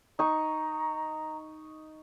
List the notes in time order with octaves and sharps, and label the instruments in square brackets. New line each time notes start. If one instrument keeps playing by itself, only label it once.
[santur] D#4 C#6 [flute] A#5